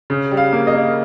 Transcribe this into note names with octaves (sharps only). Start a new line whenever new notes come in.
C#3
G3
F5
A#3
D#5
A#3